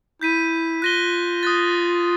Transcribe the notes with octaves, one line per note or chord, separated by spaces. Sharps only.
E4 G6 B6 D#7
F4 F#6 A#6 D#7 G7
D#6 F#6 A6